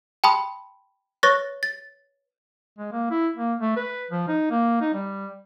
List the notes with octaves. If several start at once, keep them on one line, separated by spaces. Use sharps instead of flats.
G5 A5 B5 C6 D#6
B4 C#5 C#6 F#6 A6 A#6
A6
G#3
A#3
E4
A#3
A3
B4
F3
D#4
A#3
D#4
G3